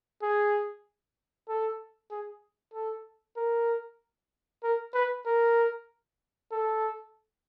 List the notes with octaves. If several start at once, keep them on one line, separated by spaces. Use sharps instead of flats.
G#4
A4
G#4
A4
A#4
A#4
B4
A#4
A4